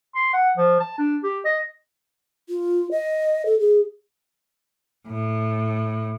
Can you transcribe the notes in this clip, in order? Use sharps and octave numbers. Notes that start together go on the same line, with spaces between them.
C6
F#5
F3
A5
D4
G4
D#5
F4
D#5
A4
G#4
A2